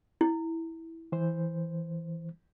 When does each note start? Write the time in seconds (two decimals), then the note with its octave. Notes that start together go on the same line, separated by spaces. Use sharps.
0.21 E4
1.12 E3 C5